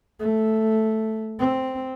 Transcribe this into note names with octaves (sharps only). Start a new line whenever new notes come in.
A3
C4